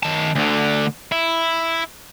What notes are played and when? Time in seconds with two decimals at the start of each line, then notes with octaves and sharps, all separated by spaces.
0.03 D#3 A5
0.35 D2 D3
1.12 E4